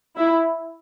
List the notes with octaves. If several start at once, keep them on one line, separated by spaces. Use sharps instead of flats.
E4